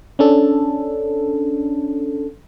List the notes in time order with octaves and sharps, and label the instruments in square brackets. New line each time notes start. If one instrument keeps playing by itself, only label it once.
[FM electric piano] C#4 D4 A4